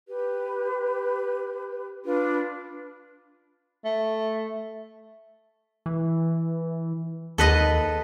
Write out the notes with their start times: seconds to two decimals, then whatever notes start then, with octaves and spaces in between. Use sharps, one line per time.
0.08 G4 B4
2.04 D4 F4 B4
3.84 A3
5.86 E3
7.38 D#2 A4 B4 D#5